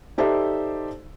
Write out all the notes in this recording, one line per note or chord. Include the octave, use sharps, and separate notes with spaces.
D#4 G4 A4 C5 D5 E5